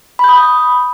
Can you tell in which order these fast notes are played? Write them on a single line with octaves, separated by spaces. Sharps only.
B5 G6 D#6